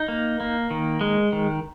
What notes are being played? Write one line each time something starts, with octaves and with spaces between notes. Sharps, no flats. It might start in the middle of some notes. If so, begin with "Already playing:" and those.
Already playing: D#4
A#3
A#3
D#3
G#3
D#3